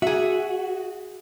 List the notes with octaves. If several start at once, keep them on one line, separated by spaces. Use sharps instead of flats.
F#4 G#4 E5